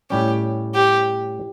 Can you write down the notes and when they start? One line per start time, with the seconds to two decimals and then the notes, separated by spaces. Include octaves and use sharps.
0.10 A2 G3 C#4 G4
0.75 G4